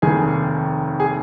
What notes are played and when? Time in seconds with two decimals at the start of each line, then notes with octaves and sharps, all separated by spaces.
0.02 F1 D#2 D#3 G#4
1.00 G#4